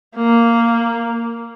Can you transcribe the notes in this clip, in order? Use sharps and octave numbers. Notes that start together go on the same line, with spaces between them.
A#3